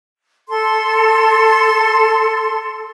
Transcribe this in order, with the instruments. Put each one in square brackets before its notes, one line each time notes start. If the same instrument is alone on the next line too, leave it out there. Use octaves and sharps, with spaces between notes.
[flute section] A4 C6